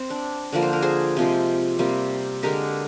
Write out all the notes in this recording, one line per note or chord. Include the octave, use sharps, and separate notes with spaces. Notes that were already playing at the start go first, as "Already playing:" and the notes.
Already playing: C4
D4
D3 F3 A#3 D5
C5
A#4
G#4 C5
C3 F3 G#3
C3 G3 A#3
D3 G#3 G4 A#4